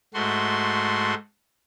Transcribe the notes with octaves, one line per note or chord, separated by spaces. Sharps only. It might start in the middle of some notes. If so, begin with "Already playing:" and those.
G#2 A3 F#4 C6